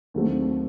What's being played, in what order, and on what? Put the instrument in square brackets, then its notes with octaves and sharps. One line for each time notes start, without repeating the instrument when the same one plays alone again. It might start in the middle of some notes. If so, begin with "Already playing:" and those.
[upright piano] D#2 D3 F#3 A3 C4